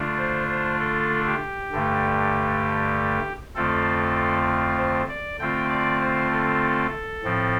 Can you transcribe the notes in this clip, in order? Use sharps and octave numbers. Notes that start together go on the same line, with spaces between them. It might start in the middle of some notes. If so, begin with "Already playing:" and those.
Already playing: D3 A3 D4 F4
C5
C5
A4
G4
G2 D3 A3
F2 D3 A3 C4 F4 A4
C5
D5
D3 A3 C4 F4 G5
D5
C5
A4
A2 F3 C4